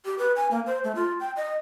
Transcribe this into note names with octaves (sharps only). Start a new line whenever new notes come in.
G4
B4
G#5
A#3
C5
A3
F4
G5
D#5